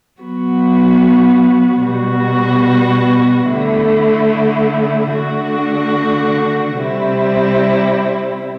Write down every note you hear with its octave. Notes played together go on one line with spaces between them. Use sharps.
F#3 B3 F#4
B2 G3 B3 F#4
D3 A3 E4
D3 A3 D4 F#4
C3 G3 C4 E4